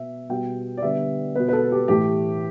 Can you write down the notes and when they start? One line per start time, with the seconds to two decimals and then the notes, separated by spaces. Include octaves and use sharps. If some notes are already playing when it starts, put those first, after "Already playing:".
Already playing: B2 B3 E5
0.29 B2 G3 B3 G5
0.77 D5
0.82 D3 G3 B3 E5
1.35 B2 B3 B4
1.48 B4
1.53 A4
1.72 G4
1.88 A2 E3 A3 G4